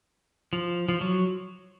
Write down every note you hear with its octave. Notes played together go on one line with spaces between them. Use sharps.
F3
F3
F#3